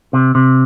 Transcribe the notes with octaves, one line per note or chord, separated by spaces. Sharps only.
C3
C3